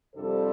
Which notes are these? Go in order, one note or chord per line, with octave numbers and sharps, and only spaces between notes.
F2 C3 G3 D4 A4 C5